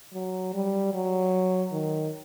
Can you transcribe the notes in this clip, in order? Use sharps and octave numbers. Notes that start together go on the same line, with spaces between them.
F#3
G3
F#3
D#3